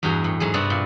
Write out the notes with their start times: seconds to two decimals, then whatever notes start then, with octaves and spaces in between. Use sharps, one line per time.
0.03 E2 G2 F#4 G#4 G5 A#5
0.24 A2
0.40 G#2 F#3 G#4
0.54 G2 C3 B3 C4 F#4 D5
0.70 A#2